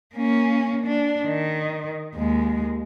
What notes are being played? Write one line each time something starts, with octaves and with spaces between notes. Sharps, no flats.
A#3 C#4
D4
D#3
D#2 G#3